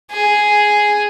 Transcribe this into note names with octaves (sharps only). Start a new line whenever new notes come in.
G#4